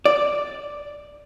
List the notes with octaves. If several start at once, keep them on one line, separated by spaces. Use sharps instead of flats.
D5